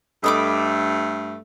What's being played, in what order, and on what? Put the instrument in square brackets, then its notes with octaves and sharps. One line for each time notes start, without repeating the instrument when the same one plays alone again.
[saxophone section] G2 A3 [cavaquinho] D#5 B5 D6